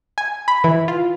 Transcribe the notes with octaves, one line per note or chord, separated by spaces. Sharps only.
G#5
B5
E3
F4